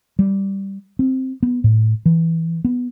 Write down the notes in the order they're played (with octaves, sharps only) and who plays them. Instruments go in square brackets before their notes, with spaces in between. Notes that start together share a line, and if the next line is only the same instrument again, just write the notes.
[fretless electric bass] G3
C4
B3
A2
E3
B3